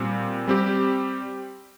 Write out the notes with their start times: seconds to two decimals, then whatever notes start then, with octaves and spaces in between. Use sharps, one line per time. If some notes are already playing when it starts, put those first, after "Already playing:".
Already playing: A#2 G3 C4
0.48 G3 C4 G4